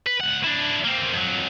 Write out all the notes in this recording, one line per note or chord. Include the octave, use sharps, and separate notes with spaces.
B4
C#2 F#5
D4 E4
A#3 C4
F2 F#3